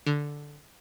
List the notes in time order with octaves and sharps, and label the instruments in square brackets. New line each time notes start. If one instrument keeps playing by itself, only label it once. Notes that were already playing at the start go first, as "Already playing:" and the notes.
[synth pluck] D3